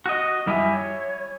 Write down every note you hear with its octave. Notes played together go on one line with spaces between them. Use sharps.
F#4 D#5
F#2 G3 E4 G4 E5 G#5
C#5